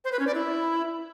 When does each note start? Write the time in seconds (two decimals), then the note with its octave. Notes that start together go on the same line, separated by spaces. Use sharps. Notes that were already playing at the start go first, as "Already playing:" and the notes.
0.05 C5
0.12 B4
0.19 C#4
0.27 D5
0.34 E4